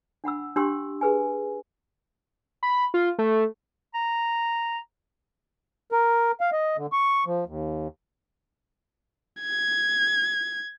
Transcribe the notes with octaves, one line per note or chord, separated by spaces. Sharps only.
D4 F#5 B5 E6
C#4 D4 G4 C6 E6
G#4 B4 G#5
B5
F4
A3
A#5
A#4
F5
D#5
D3
C#6
F3
D#2
G#6